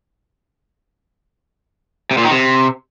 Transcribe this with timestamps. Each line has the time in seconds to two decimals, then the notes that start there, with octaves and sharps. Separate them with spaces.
2.11 C3
2.18 A#2
2.25 D#3
2.31 C3